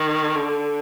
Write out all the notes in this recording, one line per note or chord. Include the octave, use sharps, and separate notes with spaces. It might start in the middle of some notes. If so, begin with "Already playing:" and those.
Already playing: D#3
D3